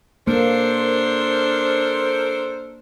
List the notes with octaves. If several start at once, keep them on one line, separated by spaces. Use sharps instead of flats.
A#3 D4 A4 A#4 C5 C6